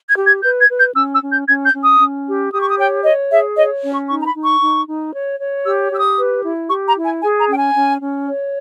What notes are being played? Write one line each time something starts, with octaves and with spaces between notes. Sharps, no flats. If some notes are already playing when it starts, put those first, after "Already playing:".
G#6
G4
G#6
B4 G6
G#6
B4
G6
C#4 E6
E6
C#4
G6
C#4 G#6
G6
C#4
D#6
C#4
G4
G4 D#6
C#6
D#6
C#5 G5
C#5 D#5
G#4 E5
C#5 D#5
C#4
C#6
D#4 C#6
A#5
B5
D#4
C#6
D#4
D#4
C#5
C#5
G4 E6
G4 E6
D#6
B4
E4
G4 C#6
A#5
E4
G#5
G#4 G#5
A#5
C#4 G5
G#5
C#4
C#4
C#5